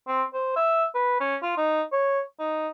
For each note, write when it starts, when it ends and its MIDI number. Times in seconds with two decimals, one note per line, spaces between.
0.08 0.24 60
0.34 0.53 72
0.56 0.85 76
0.95 1.20 71
1.21 1.36 61
1.43 1.52 65
1.58 1.82 63
1.92 2.21 73
2.40 2.69 63